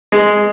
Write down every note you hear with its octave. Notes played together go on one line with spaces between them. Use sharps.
G#3